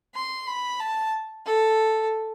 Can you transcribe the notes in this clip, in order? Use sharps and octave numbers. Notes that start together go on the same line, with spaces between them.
C6
B5
A5
A4